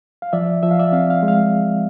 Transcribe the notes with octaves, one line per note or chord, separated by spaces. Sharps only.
F5
F3 D5 E5
F3 E5
F5
D5 E5
C4 F5
F5
G#3
F5